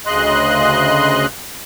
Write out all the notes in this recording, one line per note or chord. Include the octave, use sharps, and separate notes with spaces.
D2 C#3 D#5 C6 F#6